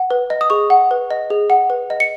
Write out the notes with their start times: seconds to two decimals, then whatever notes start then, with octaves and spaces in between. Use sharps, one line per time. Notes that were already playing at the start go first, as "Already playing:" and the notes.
Already playing: F#5
0.11 B4
0.30 D#5
0.41 D#6
0.50 G#4 C#6
0.70 F#5
0.91 B4
1.11 D#5
1.30 G#4
1.50 F#5
1.70 B4
1.90 D#5
2.00 C#7